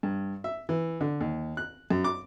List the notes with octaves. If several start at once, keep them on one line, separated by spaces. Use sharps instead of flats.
G2
E5
E3
D3
D#2
F#6
F#2
D6